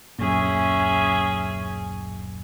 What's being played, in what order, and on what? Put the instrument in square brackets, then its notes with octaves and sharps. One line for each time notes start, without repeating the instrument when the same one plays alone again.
[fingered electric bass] D1 F#2 A#2 [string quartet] C#4 G#4 E5